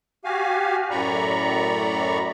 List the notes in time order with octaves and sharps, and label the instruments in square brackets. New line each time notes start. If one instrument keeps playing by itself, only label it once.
[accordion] F#4 G4 F5 G#5
F#2 A2 D5 A#5 B5 C#6